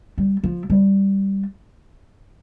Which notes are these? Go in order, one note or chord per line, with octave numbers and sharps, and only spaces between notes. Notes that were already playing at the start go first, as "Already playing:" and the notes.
G3
F3
G3